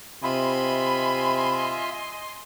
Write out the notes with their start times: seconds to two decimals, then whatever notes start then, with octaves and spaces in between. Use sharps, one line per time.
0.23 C3 F4 D#5 E5 G#5 B5 C6